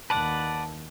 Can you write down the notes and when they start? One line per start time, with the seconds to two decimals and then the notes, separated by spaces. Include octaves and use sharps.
0.10 D#2 B4 D5 F#5 A5